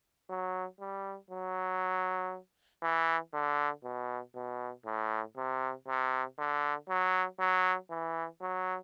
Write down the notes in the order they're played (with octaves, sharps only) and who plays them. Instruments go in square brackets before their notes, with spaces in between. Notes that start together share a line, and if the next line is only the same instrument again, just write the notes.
[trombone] F#3
G3
F#3
E3
D3
B2
B2
A2
C3
C3
D3
F#3
F#3
E3
F#3